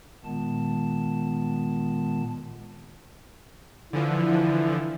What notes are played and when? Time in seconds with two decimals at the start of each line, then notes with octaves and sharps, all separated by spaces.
0.25 A#2 D#3 G#3 B3 A5
3.93 D3 E3 F3 E4